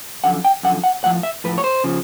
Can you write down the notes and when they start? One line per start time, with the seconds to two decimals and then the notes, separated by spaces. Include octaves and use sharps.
0.24 F#2 D3 F3 F#5
0.45 G5
0.63 F#2 D3 F3 F#5
0.84 F#5
1.04 A2 F3 F#5
1.23 E5
1.44 A2 F3 B4
1.58 C#5
1.64 C5
1.84 C#3 F3